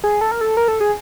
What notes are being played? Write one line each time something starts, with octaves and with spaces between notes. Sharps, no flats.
G#4
A4
A#4
A4
A#4
A4
G#4